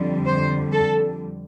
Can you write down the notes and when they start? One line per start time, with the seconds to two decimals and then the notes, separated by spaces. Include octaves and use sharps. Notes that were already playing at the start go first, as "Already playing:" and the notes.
Already playing: F2 D3 G3
0.26 C5
0.72 A4